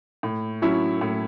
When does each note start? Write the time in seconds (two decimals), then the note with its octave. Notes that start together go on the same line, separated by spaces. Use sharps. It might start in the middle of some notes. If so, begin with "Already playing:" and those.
0.23 A2
0.62 F#3 C#4 E4
1.01 A2